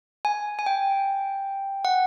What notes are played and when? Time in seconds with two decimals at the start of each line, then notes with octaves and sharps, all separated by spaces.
0.25 G#5
0.59 G#5
0.66 G5
1.85 F#5